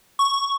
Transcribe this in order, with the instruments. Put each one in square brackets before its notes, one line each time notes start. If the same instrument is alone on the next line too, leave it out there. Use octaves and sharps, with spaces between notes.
[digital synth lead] C#6